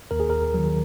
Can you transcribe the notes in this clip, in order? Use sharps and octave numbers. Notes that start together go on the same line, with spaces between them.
D#2 A#4
G#4
A#4
D#3 F#3